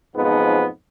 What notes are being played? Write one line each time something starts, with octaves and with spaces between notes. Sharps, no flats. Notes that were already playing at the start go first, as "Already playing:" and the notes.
B1 F2 G#2 F3 G#3 B3